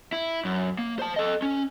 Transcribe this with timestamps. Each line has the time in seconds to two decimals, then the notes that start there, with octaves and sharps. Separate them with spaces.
0.12 E4
0.45 F#2
0.79 A#3
0.99 C5 A5
1.16 A4 D#5
1.42 C#4